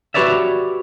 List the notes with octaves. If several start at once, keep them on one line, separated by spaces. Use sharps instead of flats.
F#4 G4 B4 C#5 D5 E5